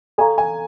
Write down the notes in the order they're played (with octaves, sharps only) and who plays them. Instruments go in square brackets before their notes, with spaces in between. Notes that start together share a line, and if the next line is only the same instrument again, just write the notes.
[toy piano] A4 D5 F5 A#5 C#6 [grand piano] G#5
[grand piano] G#5